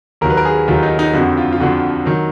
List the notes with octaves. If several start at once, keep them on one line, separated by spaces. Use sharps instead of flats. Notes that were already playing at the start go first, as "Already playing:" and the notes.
D#2 D#3 F#3 A#4
B4
A#4
G#4
D#2 D#3 F#3 F4
D#4
D#4
F2 D3 F3 F#4
F4
F4
F2 D3 F3 F#4
D#3 F#3